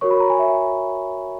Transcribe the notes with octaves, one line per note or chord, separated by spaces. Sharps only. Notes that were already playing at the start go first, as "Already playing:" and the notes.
F#4 A#4 C#5 C#6
B5
A#5
G#5
E5